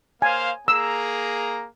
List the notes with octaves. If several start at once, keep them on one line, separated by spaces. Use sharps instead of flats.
A#3 C5 F5 G#5
A#3 G#4 A#5 E6